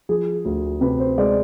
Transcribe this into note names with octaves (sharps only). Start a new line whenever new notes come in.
F3 G#4
D2
C3 B4
C5
G#3 D5